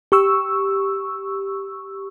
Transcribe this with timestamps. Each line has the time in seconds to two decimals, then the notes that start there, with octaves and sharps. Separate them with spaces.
0.12 G4 C#6 E6